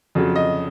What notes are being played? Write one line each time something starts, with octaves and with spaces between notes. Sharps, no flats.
F2 C#3 F#3
D#5